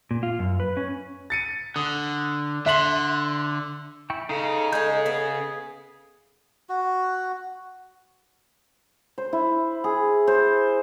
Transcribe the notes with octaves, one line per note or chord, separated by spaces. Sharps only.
A#2
F4
F#2
B4
C#4
A6 C#7 D#7
D3 D#6
D3 E5 C6 F#7
E4 G5 C#6
C#3 D#4 A4 D#5
G#3 D#4 G#4 G6
B3
F#4
C5
E4
G#4
C5